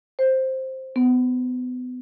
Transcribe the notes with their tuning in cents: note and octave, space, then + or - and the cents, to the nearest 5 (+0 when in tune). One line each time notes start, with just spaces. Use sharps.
C5 +5
B3 +25